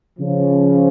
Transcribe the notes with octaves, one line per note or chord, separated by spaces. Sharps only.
C#3 F3